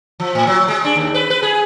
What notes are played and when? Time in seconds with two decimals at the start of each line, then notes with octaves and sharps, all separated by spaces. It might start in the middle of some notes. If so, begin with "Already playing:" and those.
0.20 F3
0.35 A2
0.47 F#3
0.68 G#3
0.84 D4
0.96 D#2
1.14 B4
1.30 B4
1.43 G#4